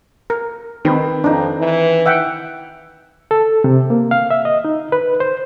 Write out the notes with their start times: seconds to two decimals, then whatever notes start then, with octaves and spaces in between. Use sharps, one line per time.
0.30 A#4
0.85 D#3 C4 B4 B5
1.24 F2 D4 D#4
1.60 E3
2.06 E5 F#5 G5
3.31 A4
3.64 C3
3.90 A#3
4.11 F5
4.31 E5
4.45 D#5
4.65 D#4
4.92 B4
5.20 C5